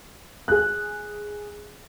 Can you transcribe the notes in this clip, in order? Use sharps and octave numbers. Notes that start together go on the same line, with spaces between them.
G#4 F#6